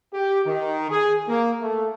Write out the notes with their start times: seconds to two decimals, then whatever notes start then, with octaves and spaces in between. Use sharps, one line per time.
0.14 G4
0.46 D#3
0.90 G#4
1.28 A#3
1.62 A3